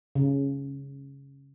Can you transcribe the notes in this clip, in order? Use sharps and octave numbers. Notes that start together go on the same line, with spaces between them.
C#3